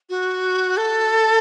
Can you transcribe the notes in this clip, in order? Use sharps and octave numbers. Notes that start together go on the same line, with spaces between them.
F#4
A4